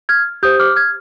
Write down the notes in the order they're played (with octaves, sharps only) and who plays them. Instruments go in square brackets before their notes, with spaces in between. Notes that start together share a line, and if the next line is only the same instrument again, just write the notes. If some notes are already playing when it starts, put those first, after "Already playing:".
[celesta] F6 G#6
G4 C5 D#6 G6
D6 F6
F6 G#6